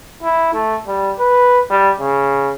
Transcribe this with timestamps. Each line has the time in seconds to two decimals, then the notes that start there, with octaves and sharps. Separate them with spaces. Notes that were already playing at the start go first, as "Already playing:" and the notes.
0.23 E4
0.53 A3
0.87 G3
1.19 B4
1.70 G3
1.99 C#3